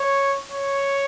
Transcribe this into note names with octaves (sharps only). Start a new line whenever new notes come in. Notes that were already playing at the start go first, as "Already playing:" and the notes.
Already playing: C#5
C#5